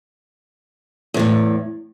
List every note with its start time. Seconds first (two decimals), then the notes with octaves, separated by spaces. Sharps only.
1.14 E2
1.17 C3
1.19 A2